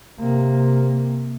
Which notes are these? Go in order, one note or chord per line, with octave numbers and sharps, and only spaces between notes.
C3 A#3